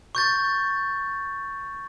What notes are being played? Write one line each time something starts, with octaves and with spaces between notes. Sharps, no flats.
C#6 G6 A6